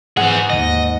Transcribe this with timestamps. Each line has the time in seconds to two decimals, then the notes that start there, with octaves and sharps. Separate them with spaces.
0.17 G#2 E3 G#4 F#5
0.50 D#2 D#5